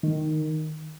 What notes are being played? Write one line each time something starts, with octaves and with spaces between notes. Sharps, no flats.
D#3